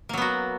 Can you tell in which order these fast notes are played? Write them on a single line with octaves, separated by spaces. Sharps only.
A#3 F#3 B3 F#4